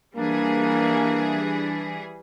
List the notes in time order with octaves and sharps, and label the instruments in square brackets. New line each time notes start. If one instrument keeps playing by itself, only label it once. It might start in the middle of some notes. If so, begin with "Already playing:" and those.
[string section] E3 G3 G#4 [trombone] A#3 [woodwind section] D4